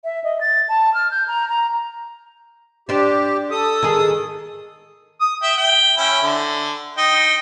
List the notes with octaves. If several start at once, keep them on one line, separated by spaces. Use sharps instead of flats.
E5
D#5
A6
A5
F6
G6
A#5
A#5
D4 G4 C5
A4 D#6
D#3 G#4
D#6
E5 G5
G5
C#4 E4 G5
D3
D#4 G5